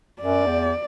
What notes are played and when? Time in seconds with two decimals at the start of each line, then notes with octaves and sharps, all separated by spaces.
0.21 F#2 D5
0.46 E2